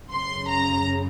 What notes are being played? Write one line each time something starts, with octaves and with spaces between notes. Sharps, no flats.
F#2 C#3 C6
A#5